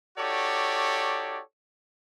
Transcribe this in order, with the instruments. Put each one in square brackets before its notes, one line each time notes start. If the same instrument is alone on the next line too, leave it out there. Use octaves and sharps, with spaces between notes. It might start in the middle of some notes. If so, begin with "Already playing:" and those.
[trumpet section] D#4 F#4 G4 A4 C#5 D5